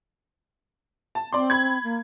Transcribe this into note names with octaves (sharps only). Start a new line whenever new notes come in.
A5
C4 D5 C6
B5 G#6
A#3